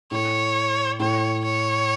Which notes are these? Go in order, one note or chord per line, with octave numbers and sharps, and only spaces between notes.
A2 C#5
A2 C#5
C#5